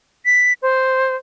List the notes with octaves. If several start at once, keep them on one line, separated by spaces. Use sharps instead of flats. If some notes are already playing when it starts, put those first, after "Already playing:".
B6
C5